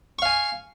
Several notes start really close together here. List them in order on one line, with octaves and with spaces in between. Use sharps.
C#6 F5 G#5